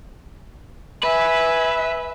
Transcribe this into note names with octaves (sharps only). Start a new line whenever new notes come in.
B4 E5 G#5